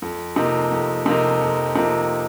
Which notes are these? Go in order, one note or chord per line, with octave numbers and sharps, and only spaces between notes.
F2
C3 F3 A#3 D#4
F2
C3 F3 A#3 D#4
F2
C3 F3 A#3 D#4